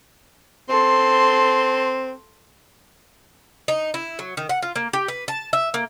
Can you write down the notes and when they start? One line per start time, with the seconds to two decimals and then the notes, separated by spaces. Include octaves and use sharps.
0.69 C4 A4 C6
3.68 D#4
3.94 E4
4.19 F#3
4.37 D#3
4.49 F#5
4.62 F4
4.76 A#3
4.93 G4
5.08 B4
5.28 A5
5.53 E5
5.74 A#3